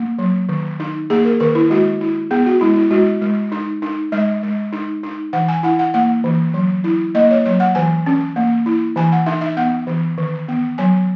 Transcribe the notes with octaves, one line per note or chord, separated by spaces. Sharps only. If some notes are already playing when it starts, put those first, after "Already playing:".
Already playing: A#3
F#3
D#3
D#4
A#3 G#4
A#4
D#3 A#4
E4
G#3 F#4
E4
B3 G#4
F#4
G#3 E4
E4
G#3 F#4
G#3
D#4
D#4
G#3 E5
G#3
D#4
D#4
E3 F#5
G#5
E4 F#5
F#5
A#3 F#5
E3
F#3
E4
A#3 D#5
C#5
F#3 C#5
F#5
E3 G#5
C#4
A#3
E4
E3 G#5
F#5
D#4 E5
E5
B3 F#5
E3
D#3
B3
F#3 G#5